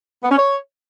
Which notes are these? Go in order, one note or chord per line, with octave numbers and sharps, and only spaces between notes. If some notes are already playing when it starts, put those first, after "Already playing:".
B3
C#4
C#5